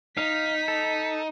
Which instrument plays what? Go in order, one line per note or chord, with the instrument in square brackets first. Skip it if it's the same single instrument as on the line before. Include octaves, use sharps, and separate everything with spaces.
[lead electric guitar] D#4 [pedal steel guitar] F5 [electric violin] B6
[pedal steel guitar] A4